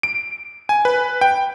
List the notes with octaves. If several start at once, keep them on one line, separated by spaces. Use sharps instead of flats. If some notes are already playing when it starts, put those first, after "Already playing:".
D7
G#5
B4
G5